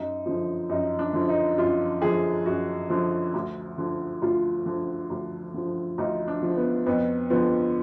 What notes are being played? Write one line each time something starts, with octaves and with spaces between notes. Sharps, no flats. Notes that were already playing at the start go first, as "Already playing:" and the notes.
Already playing: F#2 D#4
D3 F3
F#2 D#4
D4
D3 F3
D#4
F#2 F4
D3 F3 G#4
F#2 F#4
D3 F3
D2
D3 F3
D2 F4
D3 F3
D2
D3 F3
D2 D#4
D4
D3 F3
B3
F2 B3
D3 F3 B3